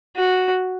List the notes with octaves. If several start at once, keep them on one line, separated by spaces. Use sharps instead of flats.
F#4